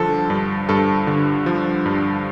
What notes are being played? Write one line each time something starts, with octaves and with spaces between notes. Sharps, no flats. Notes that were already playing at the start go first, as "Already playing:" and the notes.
Already playing: G2 D3 F3 A4
G2
G2 A4
D3
F3
G2